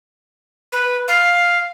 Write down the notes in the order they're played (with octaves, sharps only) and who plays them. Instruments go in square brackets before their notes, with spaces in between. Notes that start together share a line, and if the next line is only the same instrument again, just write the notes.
[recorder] B4
F5